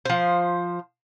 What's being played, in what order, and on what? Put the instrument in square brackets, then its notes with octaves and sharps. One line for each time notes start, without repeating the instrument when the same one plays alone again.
[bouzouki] F3 C5